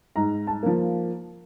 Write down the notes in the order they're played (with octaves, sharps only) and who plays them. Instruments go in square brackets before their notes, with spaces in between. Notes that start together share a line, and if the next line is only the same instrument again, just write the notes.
[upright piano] G#2 A#5
A5
F3 A#3